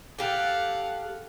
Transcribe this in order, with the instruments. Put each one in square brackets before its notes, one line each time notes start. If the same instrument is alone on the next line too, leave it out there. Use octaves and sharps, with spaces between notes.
[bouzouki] G4 A4 [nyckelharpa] F5 F#5